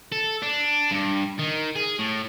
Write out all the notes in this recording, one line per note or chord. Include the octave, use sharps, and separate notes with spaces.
A4
D4
G2
D#3
G#4
A2